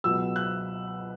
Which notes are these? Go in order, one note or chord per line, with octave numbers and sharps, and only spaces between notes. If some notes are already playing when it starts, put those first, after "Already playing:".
C#2 B2 F#3 E6
F#6